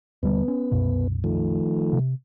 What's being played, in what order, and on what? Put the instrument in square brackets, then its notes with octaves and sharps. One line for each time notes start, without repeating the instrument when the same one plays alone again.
[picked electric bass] D#2 D3 G3 [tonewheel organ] B3
[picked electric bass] C#4
C2 F#2 B2
[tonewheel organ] D#3 F3 A3
[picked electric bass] C3